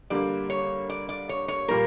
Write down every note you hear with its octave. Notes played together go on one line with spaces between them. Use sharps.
D3 G3 A#3 D5
C#5
D5
D5
C#5
C#5
A#2 G3 A#3 A#4